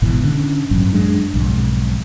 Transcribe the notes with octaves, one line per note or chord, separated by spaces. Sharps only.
G#1 G#2 B2 E3
D3 C#4
A1 G2 F#3 C#4
F#2 F#3 G#3 D4
B1 F2 G#2